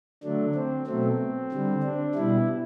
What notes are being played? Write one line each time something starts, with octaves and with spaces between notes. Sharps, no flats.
D3 F#3 A3 D4
C4
B2 F#3 A3 C4
D3 G3
D4
B2 G3 E4